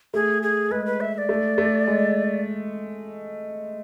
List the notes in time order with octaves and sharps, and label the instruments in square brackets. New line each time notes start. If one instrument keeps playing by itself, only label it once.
[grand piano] A3 [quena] G#4
[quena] G#4
[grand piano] G#3 [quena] B4
[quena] B4
E5
E5
D5
[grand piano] A3
A3
G#3